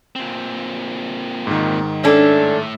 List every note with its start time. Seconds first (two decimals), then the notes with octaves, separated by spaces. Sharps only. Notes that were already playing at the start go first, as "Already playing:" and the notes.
0.16 A#2 C4
1.47 G#2 D#3
2.04 A2 C#4 D4 A4 E5